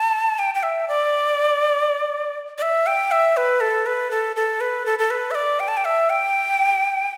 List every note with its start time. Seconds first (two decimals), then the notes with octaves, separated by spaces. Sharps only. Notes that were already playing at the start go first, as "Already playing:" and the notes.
Already playing: A5
0.39 G5
0.55 G5
0.63 E5
0.88 D5
2.58 D5
2.62 E5
2.87 G5
3.11 E5
3.37 B4
3.61 A4
3.86 B4
4.11 A4
4.36 A4
4.61 B4
4.86 A4
4.99 A4
5.10 B4
5.31 E5
5.35 D5
5.60 G5
5.68 A5
5.77 G5
5.85 E5
6.10 G5